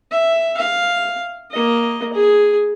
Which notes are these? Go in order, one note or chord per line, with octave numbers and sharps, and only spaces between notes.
E5
F5
A#3 D#5
G#4